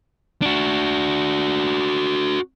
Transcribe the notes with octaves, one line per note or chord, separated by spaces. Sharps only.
D4 F#4